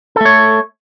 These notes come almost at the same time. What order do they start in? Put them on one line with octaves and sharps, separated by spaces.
A4 A3 C#5